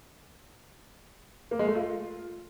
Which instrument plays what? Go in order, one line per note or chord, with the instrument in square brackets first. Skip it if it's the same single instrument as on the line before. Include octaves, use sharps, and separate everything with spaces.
[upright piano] A#3
G#3
A3
F4